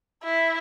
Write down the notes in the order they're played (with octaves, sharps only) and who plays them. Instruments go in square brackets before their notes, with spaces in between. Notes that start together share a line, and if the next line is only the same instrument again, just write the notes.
[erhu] E4